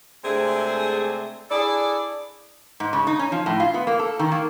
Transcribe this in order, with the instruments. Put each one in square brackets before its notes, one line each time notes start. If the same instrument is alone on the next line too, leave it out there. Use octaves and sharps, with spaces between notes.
[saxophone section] C3 G#3 A3 C4 D4 G#4
D4 E4 G#4 A4 D5
[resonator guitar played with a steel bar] G#2
C#3
D#4
C#4
F3
A2
F4
B3
A#3
A4
D#3
A#3